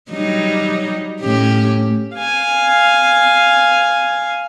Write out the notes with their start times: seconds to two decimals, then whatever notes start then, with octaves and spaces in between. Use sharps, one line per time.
0.12 F#3 G3 D#4
1.21 A2 C#4 G4
2.15 F5 G#5